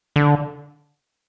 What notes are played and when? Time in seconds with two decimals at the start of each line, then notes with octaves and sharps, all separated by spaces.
0.16 D3